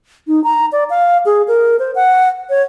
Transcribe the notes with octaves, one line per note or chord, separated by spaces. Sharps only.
D#4
A#5
D5
F5
G#4
A#4
C5
F#5
C#5